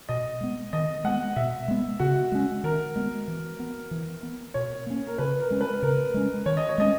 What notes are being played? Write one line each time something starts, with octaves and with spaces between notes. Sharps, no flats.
B2 D#5
G#3 B3
D#3 D#5
G#3 B3 F#5
B2 E5
G#3 B3
C#3 F#4
G#3 C#4
D#3 A#4
G#3 B3
E3
B3
E3
B3
B2 C#5
A#3 C#4
A#4
C#3 B4
A#4
G#3 C#4
B4
C#3 A#4
G#3 C#4
D#3 C#5
D#5
C#5
G#3 C#4 D#5